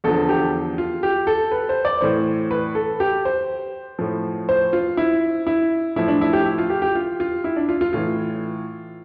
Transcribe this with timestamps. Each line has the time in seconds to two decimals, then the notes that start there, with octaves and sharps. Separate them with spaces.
0.04 E2 D3 F3 A4
0.29 G4
0.78 F4
1.03 G4
1.27 A4
1.52 B4
1.69 C5
1.85 D5
2.01 A2 E3 C5
2.51 B4
2.75 A4
3.00 G4
3.25 C5
3.99 A2 F3
4.49 C5
4.73 F4
4.97 E4
5.47 E4
5.96 A2 F3 E4
6.08 D4
6.21 E4
6.33 G4
6.46 E4
6.58 F4
6.70 G4
6.82 G4
6.95 F4
7.20 F4
7.44 E4
7.57 D4
7.69 F4
7.81 F4
7.93 A2 E3 F4